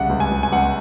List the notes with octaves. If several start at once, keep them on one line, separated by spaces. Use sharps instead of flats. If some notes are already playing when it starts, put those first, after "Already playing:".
Already playing: C2 C#3 F#5
C#2
G#5
C#2
G#5
C#2 F#5